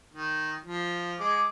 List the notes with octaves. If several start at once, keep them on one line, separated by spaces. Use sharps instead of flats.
D#3
F3
G#3 G#4 D6